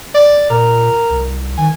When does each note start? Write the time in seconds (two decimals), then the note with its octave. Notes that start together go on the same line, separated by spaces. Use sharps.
0.14 D5
0.50 A#2 A#4
1.10 C2
1.57 D#3 G#5